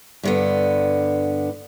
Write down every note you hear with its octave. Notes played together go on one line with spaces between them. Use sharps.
G2 D3 B3